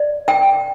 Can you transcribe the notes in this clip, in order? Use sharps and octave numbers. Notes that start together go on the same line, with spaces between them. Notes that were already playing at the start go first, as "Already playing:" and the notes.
Already playing: D5
G5